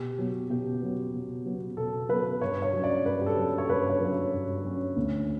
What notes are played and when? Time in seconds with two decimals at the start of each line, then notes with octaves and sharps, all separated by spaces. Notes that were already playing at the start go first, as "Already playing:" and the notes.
Already playing: B2 G4
0.18 F#3 B3
0.50 B2 G4
0.82 F#3 B3
1.13 B2
1.46 F#3 B3
1.77 B2 A4
2.09 F#3 B3 B4
2.42 G2 C#5
2.62 C#5
2.73 F#3 C#4
2.84 D5
3.05 G2 B4
3.21 G4
3.26 A4
3.36 F#3 C#4
3.58 C#5
3.69 G2 B4
3.90 C#5
4.01 F#3 C#4
4.33 G2
4.64 F#3 C#4
4.96 D2